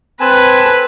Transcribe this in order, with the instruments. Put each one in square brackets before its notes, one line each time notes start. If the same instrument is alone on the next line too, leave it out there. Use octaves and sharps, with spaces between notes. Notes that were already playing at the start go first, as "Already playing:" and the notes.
[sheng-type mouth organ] C4 G#5 A5 [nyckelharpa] B4